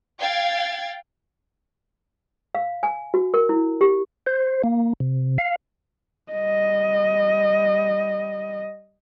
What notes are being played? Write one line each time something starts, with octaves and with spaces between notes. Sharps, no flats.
F5 G5 G#6 A6 C7
F5
G#5
F#4
A#4
E4
G4
C5
A#3
C3
F5
G3 D#5